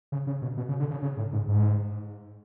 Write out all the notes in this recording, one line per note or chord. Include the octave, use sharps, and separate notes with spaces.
C#3
C#3
B2
B2
C#3
D3
C#3
C#3
A2
G#2
G#2